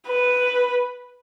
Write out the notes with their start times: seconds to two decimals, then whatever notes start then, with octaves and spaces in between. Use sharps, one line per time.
0.09 B4